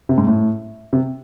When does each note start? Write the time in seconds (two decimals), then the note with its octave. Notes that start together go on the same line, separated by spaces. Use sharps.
0.09 C3
0.18 G#2
0.27 A2
0.93 C3